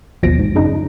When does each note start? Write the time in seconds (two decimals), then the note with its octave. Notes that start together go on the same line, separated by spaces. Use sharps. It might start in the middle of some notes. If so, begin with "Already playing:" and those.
0.23 A1 D#2 B2 F3 A#6 D7
0.39 G#2
0.55 F#2 C#3 D4 D#4